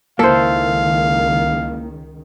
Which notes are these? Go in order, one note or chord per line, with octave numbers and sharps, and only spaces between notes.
C#2 D#3 A#3 E4 A4 C5 F5